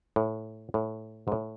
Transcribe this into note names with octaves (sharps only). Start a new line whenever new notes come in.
A2
A2
G#2
A2